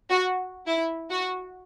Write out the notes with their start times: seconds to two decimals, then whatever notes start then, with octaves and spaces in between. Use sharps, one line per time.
0.10 F#4
0.67 E4
1.10 F#4